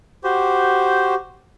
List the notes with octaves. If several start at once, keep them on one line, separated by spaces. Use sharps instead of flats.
F#4 G4 C5